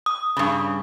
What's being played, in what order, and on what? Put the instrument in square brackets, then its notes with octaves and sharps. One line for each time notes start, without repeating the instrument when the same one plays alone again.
[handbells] D#6
[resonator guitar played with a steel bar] G2 C#3